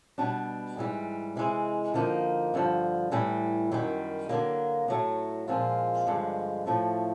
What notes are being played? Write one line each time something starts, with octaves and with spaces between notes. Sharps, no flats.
B2 G3 B3 D4
G#2 E3 G3
C3 E3 G#3
D3 F3 A#3 D#4
G2 D3 F3
A2 E3 G3
F#2 D#3 G3
D3 F#3 A#3
A2 F#3 A3
A#2 F3 G#3 C4 F4
G2 D3 F3 G#3
A2 F3 A3